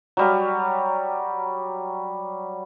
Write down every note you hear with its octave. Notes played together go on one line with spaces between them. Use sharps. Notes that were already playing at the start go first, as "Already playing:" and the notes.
F#3 G3 A#5